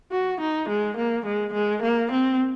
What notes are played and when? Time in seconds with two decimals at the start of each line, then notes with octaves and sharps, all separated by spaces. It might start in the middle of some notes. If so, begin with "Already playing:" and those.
0.12 F#4
0.40 D#4
0.69 G#3
0.97 A#3
1.26 G#3
1.53 G#3
1.82 A#3
2.11 C4